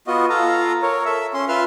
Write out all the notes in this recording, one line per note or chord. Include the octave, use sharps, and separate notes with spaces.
B3 F4 F#4 D#5
F4 A4 F5 A#5
A#4 C#5
A4 E5
C#4 C6
F4 B4 E5 C6 F6